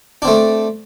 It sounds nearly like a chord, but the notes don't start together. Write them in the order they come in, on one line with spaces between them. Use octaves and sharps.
D4 C4 A3